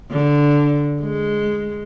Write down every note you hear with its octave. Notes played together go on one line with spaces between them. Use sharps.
D3
G#3